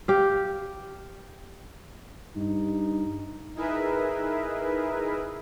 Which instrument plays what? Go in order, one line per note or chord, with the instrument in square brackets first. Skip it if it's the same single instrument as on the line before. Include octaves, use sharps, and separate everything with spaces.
[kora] G4 F5
[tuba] G2 [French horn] D#4
[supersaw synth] D#4 E4 G#4 A#4 B4 E5